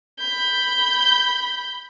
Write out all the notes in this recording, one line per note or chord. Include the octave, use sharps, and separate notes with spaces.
B5 G6